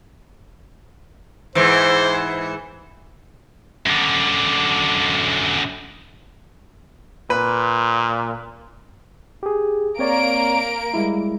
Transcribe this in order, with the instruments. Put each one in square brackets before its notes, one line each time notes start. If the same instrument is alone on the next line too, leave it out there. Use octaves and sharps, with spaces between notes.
[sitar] G#2 E3 [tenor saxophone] C5
[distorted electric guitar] F#2 D3
[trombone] A#2 [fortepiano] B4
[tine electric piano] G4 G#4
[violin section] A#3 A#4 D7 [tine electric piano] C4 C#5 D5
[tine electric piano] G3 G#3 E4